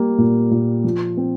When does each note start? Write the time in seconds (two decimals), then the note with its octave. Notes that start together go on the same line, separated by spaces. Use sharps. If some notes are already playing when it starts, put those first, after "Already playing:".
Already playing: G3 A#3
0.18 A#2
0.51 A#2
0.84 F3
1.17 C4